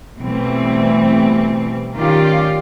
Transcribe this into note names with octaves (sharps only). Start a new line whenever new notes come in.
B2 E3 G3 A3 C4
D#3 C#4 D#4 F4 G4 D5